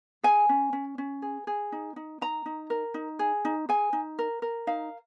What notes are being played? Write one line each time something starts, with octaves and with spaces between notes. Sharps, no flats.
G#4 G#5
C#4
C#4
C#4
G#4
G#4
D#4
D#4
D#4 A#5
D#4
A#4
D#4
G#4
D#4
G#4 G#5
D#4
A#4
A#4
D#4 F5